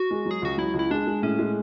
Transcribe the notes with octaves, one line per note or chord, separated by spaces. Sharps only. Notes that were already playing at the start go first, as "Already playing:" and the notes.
Already playing: F#4
G#3
F#3
G#4
C#2 F#4
F#3 E4
C#2
E4
G#3 D4
G#3
A2 C#4
G#3